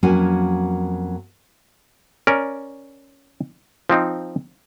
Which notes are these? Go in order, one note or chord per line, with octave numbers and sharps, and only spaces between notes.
F2 F#3 A#3 C#4 F#4 G#5
C#4 A#4 D5
F3 C4 D#4